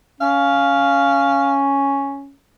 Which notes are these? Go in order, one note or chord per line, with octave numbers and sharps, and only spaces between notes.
C#4 F5